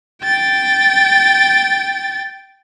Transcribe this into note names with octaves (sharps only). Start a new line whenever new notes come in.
G5 A6